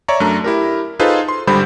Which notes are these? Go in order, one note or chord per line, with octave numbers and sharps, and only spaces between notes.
C#5 D5 E5 A#5 C#6
F#2 A3 D4 A#5
E4 G4 A#4
D#4 F4 G#4 A4 B4 C5
C6
G#1 D3 G3 C5 B5 G6